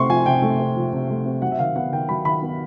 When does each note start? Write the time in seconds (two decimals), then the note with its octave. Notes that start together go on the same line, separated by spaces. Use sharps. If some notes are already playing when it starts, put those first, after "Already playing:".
Already playing: C3 A3 C4 C6 C#6
0.09 F3 G#5
0.26 C3 G5
0.42 A3
0.59 C4
0.76 F3
0.93 C3
1.10 A3
1.26 C4
1.42 F#3 F#5
1.52 E5
1.59 D#3 F5
1.76 B3 F#5
1.92 D#3 G5
2.09 F#3 B5
2.25 D#3 B5
2.42 B3